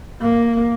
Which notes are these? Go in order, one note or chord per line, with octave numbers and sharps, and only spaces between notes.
A#3